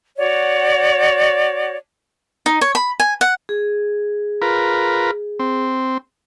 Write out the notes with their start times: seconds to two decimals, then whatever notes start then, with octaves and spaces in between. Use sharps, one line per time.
0.18 F#4 C#5 D5 F#5
2.46 D#4
2.61 C#5
2.75 B5
3.00 G#5
3.21 F#5
3.49 G#4
4.42 F4 A#4 B4
5.39 C4